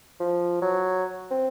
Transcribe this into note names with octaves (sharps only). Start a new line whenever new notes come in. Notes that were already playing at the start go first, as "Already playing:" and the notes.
F3
F#3
C4